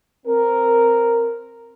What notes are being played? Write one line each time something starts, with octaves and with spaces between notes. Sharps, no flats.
C4 A#4